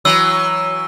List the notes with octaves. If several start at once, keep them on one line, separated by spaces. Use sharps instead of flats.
E3 F#3 E6